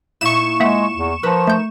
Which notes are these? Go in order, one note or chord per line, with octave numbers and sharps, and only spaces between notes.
A#2 D#4 E4 C#6 E7
G#3 A#3 E5 F#5
E2
F3 D#4 A#4 B4
A3 G6